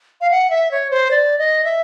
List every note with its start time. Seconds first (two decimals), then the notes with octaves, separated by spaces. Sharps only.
0.21 F5
0.31 F#5
0.50 E5
0.71 C#5
0.91 C5
1.11 D5
1.39 D#5
1.64 E5